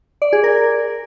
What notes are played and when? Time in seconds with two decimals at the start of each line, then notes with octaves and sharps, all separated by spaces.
0.22 D5
0.33 G#4
0.44 A#4